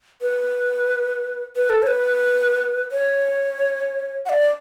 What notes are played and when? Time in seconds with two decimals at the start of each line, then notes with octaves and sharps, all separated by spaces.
0.22 B4
1.56 B4
1.70 A4
1.83 C#5
1.87 B4
2.92 C#5
4.26 F#5
4.29 D5